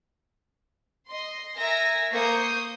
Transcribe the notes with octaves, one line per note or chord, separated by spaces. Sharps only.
D#5 C6
A#4 E5 G#5 A#6
A#3 C5 C#6 D#6 G6